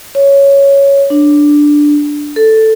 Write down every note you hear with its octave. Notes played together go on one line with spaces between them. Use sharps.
C#5
D4
A4